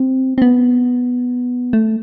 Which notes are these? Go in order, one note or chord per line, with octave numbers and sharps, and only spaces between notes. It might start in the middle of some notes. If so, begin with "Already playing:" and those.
Already playing: C4
C4
B3
A3